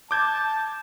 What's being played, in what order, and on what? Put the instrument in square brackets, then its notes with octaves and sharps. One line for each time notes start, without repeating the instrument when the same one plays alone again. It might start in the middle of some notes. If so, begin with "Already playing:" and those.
[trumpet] A5 [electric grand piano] D6 G6 G#6